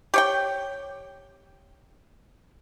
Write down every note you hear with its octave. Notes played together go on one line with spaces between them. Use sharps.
G4 C#5 G5